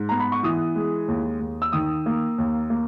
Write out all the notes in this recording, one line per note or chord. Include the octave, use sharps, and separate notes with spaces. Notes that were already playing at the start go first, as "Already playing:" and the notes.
Already playing: G#2
B3 A#5
B5
C#6
E3 D#6
G#3
D#2
D#2
E6
D#3 D#6
A#3
D#2
A#3